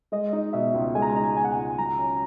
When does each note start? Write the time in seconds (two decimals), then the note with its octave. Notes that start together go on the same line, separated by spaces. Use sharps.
0.12 G#3 D#5
0.33 D#4
0.53 B2 E5
0.74 C#2
0.95 G#3 G#5
1.02 A#5
1.09 G#5
1.15 D#4 A#5
1.23 G#5
1.36 B2 G#5
1.44 F#5
1.52 C#2 G#5
1.78 F#3 A#5
1.98 C#4